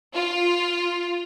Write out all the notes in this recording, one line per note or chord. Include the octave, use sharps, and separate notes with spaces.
F4